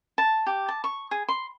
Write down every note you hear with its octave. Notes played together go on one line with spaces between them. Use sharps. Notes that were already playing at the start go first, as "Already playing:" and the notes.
A5
G4
A5
C#6
G#4
C6